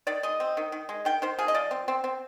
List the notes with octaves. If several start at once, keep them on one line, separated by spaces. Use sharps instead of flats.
D#3 D5
G#3 D#5
C4
D#3
D#3
G#3
D#3 G5
D#3 C5
F3 G#4
D#5
F3 D5
C4
C4
C4